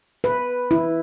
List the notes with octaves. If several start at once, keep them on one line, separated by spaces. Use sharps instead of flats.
B4
E4